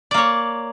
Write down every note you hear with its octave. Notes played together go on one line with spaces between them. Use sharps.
A#3 C#5 D5